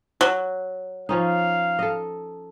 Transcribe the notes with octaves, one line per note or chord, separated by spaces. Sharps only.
F#3
F3 C#4 D#4 F5
A4 D#5